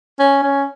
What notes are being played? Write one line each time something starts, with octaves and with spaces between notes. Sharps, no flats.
C#4
C#4